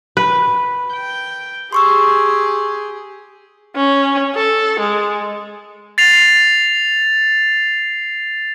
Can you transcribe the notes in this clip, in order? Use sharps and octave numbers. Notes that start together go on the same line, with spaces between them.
B4
G5
G4 G#4 C6 C#6 E6
C#4
A4
G#3
A6 C7 F7